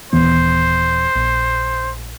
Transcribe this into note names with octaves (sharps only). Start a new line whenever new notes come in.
D#1 E3 B3 C5
A#1